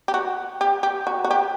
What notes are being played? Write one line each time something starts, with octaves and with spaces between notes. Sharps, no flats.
G4
F#4
G4
G4
F#4
F#4
G4